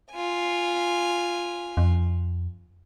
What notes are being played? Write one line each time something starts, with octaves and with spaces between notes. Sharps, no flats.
F4 G#5
F2